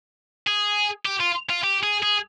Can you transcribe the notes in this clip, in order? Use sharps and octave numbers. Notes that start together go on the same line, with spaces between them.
G#4
G4
F4
F4
G4
G#4
G#4